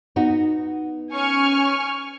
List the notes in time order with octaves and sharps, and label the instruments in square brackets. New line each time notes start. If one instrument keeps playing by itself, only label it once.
[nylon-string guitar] B3 D#4 F#4
[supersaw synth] C#4 [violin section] G#5 C#6 F6